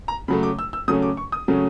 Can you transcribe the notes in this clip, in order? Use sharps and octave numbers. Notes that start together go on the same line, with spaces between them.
A#5
C#3 F#3 A3 B5
D6
E6
E6
C#3 F#3 A3 C#4 D#6
D6
C#6
D#6
C#3 F#3 A3 C#4